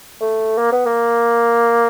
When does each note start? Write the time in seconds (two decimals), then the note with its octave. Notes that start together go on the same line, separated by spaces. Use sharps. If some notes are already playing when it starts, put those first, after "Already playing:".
0.21 A3
0.58 A#3
0.72 B3
0.86 A#3